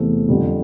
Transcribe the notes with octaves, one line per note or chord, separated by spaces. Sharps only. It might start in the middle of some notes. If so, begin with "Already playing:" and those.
Already playing: E2 C3 E3 A3 C4
F2 D3 G3